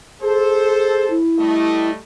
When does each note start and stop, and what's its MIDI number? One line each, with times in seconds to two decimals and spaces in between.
0.22 1.09 68
0.22 1.16 69
0.22 1.16 72
1.10 1.91 64
1.39 1.97 55
1.39 1.97 57
1.39 1.97 75